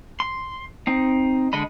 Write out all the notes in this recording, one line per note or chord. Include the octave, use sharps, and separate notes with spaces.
C6
C4 D#4
D3 G#3 D#5 B5